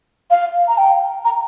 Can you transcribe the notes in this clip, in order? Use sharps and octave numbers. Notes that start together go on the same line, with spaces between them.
F5
A#5
G5
A#5